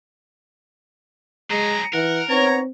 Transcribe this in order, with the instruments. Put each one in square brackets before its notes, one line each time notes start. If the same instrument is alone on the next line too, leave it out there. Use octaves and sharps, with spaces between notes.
[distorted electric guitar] F#3 G#4 [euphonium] G#3 [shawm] A#5
[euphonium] E3 [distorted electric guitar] A#4 [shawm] F#5
[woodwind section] B3 D#4 C#5 [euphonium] C4 [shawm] A#5